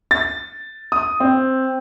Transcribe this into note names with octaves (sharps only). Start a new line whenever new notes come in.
A6
D#6
C4